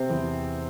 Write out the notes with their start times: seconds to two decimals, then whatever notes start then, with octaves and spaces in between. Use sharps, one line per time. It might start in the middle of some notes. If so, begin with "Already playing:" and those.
Already playing: C3 C4
0.10 E2